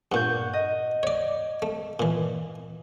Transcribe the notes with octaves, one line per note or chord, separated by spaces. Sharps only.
G2 A#2 F#5 C#6 G6
D#5
C#5 D5
A3
A#2 E3